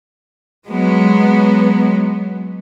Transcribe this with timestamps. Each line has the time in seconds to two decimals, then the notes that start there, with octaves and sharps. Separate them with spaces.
0.68 F#3 G#3 B3